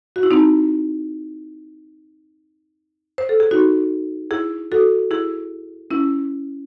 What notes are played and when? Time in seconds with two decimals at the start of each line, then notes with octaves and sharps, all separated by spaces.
0.16 F#4
0.23 E4
0.31 C4 D#4
3.18 C5
3.29 A4
3.40 G#4
3.51 D#4 F#4
4.31 E4 G#4
4.72 F#4 A4
5.11 E4 G#4
5.91 C#4 E4